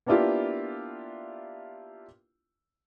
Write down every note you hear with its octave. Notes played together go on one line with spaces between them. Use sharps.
A#3 B3 D4 E4 F4 G4